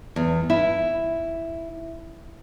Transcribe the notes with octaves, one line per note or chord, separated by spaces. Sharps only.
E2
E4